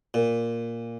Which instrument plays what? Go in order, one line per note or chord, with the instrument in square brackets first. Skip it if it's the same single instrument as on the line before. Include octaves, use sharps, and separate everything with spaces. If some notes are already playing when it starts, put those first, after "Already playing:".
[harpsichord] A#2